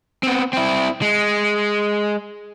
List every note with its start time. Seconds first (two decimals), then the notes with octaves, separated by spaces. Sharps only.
0.23 B3 C4
0.53 C4 E4
1.02 G#3